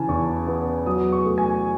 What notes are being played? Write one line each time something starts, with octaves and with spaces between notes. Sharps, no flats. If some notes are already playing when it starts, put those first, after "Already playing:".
Already playing: C#3 E3 G#5 A5
E2 C#6
B3
F#3 D#6
C#6
A3
G#5